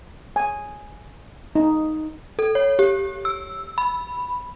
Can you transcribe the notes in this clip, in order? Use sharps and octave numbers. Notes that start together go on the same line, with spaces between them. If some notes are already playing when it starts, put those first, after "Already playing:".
G#5
D#4
A4
C#5
G4
E6
B5